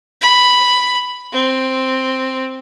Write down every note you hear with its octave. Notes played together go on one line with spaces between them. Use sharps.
B5
C4